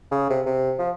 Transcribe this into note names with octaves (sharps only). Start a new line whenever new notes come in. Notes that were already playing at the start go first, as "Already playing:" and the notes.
C#3
C3
C3
F3